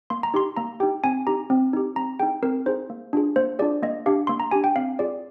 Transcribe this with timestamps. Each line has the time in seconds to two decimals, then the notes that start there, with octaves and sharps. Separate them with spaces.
0.10 A#3 C6
0.23 A#5
0.34 D#4 G4 C6
0.57 A#3 A#5
0.80 G4 G5
0.83 D#4
1.04 C4 G#5
1.27 D#4 G4 A#5
1.50 C4
1.73 D#4 G4
1.96 C4 A#5
2.19 G#4 G5
2.23 D#4
2.42 C4 A#4
2.66 D#4 G#4 C5
2.90 A#3
3.13 D4 F4 G#4
3.36 A#3 C5
3.59 D4 F4 G#4 D5
3.83 A#3 D#5
4.06 D4 G4 F5
4.27 A#3 C6
4.40 A#5
4.51 D4 G4 G#5
4.64 G5
4.76 C4 F5
4.99 F4 G#4 D5